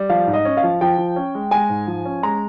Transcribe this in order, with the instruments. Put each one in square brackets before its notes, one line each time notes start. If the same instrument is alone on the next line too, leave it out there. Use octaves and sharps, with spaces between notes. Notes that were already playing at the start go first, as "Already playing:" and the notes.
Already playing: [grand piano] G3
[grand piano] F3 [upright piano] F5
[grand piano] G#2
[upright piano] D#5
[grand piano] C#4
[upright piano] F5
[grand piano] F3
[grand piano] F3 [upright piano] G5
[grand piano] F3
C#4
G#3
[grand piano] G#3 [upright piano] G#5
[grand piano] G#2
F3
C#4
[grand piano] G#3 [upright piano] A#5